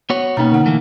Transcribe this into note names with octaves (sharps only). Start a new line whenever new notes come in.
B3 F#4 C#5
B2 A#3 B3 C#4 D#4 A#5
D3 D#4 F#5
E3 A3 A#3